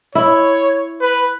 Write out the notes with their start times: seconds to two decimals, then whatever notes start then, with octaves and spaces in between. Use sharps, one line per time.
0.15 E4 C#5
1.01 B4